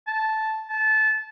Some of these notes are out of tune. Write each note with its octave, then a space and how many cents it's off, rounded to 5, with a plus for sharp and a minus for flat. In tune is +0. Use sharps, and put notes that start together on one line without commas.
A5 -5
A5 -20